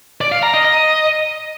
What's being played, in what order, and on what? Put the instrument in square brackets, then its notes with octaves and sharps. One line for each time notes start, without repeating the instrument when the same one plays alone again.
[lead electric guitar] D5
F5
A#5
D#5
D#5